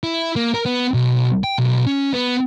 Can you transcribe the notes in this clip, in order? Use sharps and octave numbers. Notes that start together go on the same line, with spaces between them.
E4
A#3
A#4
B3
B1
G5
B1
C#4
B3